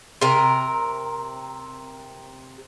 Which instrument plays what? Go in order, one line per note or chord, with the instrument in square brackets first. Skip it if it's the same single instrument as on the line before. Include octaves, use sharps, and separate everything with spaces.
[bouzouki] C3 A#4